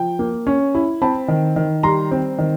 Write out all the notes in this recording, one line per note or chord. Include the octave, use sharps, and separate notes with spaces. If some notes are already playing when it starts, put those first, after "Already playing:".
Already playing: F3 G5
A#3
C#4
E4
C4 A5 B5
D#3
D#3
G3 A#5 C6
C4
D#3